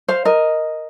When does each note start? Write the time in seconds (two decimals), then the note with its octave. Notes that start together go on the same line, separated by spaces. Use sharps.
0.08 C5 F5
0.25 A#4 D#5